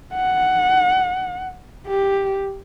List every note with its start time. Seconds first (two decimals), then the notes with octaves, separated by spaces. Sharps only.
0.13 F#5
1.87 G4